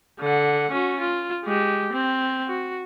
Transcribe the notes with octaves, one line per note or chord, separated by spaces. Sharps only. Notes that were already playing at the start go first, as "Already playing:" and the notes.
D3 F#5
C#4 F#4
F4
G#3 G4
C4
F#4